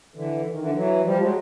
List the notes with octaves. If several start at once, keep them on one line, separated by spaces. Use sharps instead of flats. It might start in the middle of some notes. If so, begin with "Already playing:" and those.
D3 E3
D#3
D3 E3
E3 F#3
F3 G3
F#3 G#3